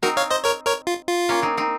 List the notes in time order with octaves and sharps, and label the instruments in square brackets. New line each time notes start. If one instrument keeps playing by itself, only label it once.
[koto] C4 D#4 [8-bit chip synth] F#4 A#4
[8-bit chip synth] C#5 F5
C5 D#5
A#4 C#5
A#4 C#5
F4
F4
[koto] A#3 C#4
C4 D#4
C4 D#4